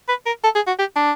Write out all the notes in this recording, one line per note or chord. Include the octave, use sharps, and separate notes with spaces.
B4
A#4
A4
G#4
F#4
G4
D4